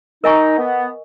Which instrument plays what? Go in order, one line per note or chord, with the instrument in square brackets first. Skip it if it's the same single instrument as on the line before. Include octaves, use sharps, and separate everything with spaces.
[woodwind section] D#4 [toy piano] A#4 D#5 G#5 C#6
[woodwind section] B3